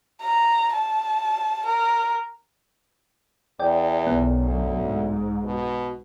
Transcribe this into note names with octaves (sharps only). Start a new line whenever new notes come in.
A#5
A5
A#4
E2 D5 G5
B1 F#2 B3
D2
G#2
B2